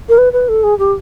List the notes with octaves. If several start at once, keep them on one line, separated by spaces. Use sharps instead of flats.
A#4
B4
B4
A4
G#4
G4